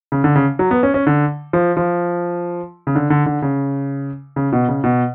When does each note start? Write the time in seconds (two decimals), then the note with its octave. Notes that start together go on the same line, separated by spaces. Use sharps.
0.12 C#3
0.24 D3
0.35 C#3
0.59 F#3
0.71 B3
0.83 C#4
0.94 C#4
1.07 D3
1.53 F3
1.77 F3
2.87 C#3
2.95 D3
3.10 D3
3.26 D3
3.42 C#3
4.36 C#3
4.52 B2
4.68 C#3
4.84 B2